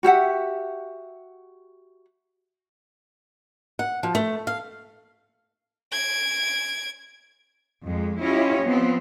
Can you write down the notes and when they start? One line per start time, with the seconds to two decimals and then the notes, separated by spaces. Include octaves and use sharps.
0.03 F#4 G4 E5 F#5
3.79 F#5
4.03 F3
4.15 A3
4.47 F5
5.92 G#6 D7
7.85 F2 G#3
8.21 C#4 E4 F4 G4 C#5 D#5
8.64 F3 B3 C4